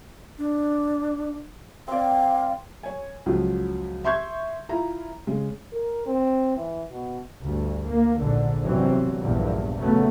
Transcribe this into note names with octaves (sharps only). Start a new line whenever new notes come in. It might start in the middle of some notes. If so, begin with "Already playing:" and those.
D4
C4 D5 F5
C#5 G#5
C#2 F3 F#3
E5 C6 C#6 G6 G#6
E4 F4 A#5
C#3 G#3
A#4
C4
E3
B2
D2 G2
A#3
A#1 G#2 D3
G1 G2 C3 E3 F#3 C4
A#1 E2 G2 A#2
C#3 F#3 A3 B3